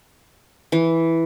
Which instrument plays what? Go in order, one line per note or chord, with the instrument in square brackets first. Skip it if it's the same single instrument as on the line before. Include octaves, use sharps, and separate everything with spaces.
[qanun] E3